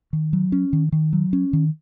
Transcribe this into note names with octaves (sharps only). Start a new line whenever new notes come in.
D#3
F#3
C#4
D#3
D#3
F#3
C#4
D#3